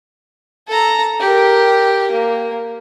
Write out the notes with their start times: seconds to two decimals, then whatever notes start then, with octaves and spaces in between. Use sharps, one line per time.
0.68 A4 A#5
1.20 G4 A#4
2.12 A#3